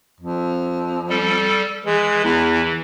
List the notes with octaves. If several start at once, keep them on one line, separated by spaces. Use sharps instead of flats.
F2
G3 A4
E3 G#3
E2